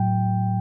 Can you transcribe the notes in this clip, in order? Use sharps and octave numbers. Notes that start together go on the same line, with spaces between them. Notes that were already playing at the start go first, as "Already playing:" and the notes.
Already playing: A2 F#3 G5